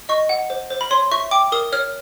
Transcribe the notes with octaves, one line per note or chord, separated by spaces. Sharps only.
D#5 C#6
F#5
C5
C5
B5
C#5 C6
E5 C#6
G5 D6
A#4 D#6
C#5 F6